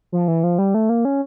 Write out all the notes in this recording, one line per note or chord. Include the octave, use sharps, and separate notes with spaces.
F3
E3
F3
G3
A3
A#3
C#4